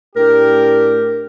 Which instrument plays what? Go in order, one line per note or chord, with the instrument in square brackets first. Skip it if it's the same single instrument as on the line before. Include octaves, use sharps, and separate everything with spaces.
[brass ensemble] A2 D4 G4 [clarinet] A#4